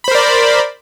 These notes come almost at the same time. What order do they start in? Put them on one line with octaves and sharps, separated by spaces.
B5 C5 A#4 D5